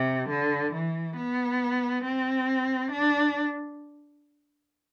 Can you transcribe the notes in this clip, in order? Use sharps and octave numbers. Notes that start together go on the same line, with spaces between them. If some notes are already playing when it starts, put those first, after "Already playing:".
Already playing: C3
D3
E3
B3
C4
D4